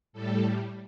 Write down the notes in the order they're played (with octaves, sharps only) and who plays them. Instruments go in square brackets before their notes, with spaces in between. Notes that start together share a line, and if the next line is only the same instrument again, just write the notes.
[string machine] A2 G3 A4